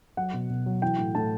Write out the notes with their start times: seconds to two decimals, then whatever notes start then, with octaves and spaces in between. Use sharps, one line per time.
0.17 F#3 F#5
0.34 B2
0.50 B2
0.66 F#3
0.82 E3 G5
0.98 A2
1.15 A2 A5